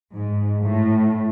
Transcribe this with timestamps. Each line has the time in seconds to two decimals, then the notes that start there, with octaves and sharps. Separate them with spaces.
0.15 G#2
0.63 A2